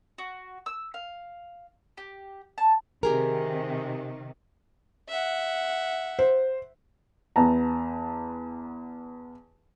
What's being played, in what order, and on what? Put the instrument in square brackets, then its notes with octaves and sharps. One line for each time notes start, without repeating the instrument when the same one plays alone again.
[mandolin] F#4
E6
F5
G4
A5
[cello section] C3 D#3 [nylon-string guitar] G4 G#4 A#4
[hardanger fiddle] E5 F#5
[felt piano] C5
[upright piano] E2 B3 A5 A#5